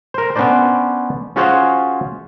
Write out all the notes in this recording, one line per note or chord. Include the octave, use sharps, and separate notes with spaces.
A#4 C5
B3 C#4 D4 C5 D5
C#4 F4 F#4 G#4 C5 C#5